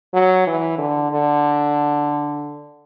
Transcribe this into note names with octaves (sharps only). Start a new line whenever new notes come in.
F#3
E3
D3
D3